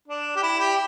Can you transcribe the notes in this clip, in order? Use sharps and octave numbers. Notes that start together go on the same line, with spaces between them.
D4
G4
E4
G4